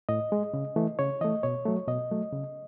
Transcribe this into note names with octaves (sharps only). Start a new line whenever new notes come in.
A2 D#5
G#3
C#3
E3 A3
C#3 C#5
E3 A3 D#5
B2 C#5
F#3 A3
B2 D#5
F#3 A3
C#3